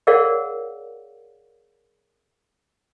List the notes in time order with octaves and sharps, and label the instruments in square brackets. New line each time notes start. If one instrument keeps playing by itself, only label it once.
[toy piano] G#4 A#4 C#5 D5 F5 F#5